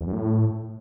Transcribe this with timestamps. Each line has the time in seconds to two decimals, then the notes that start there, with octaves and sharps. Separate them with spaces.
0.01 E2
0.07 F#2
0.13 A2